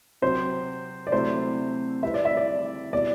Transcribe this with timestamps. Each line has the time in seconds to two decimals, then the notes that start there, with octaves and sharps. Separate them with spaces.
0.22 C3 F#3 C4 C5
1.07 D5
1.12 C3 F#3 A3 C4 E4 C5
2.03 G3 C4 E4 B4 E5
2.14 D5
2.25 E5
2.37 D5
2.93 B2 G3 B3 E4 D5